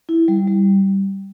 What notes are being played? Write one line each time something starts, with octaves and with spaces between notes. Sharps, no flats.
E4
G3
G3